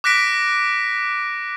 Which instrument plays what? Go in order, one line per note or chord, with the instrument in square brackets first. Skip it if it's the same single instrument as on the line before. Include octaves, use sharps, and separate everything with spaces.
[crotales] D6 F#6 A#6 B6 D7